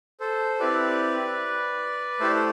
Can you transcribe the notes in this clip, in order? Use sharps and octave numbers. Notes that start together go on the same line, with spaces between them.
A4 C5
C4 E4 G4 B4 D5
A3 E4 G4 A4 C5
C5